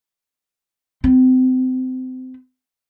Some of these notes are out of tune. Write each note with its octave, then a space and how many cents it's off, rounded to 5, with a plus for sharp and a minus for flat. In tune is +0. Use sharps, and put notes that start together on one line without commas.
C4 -30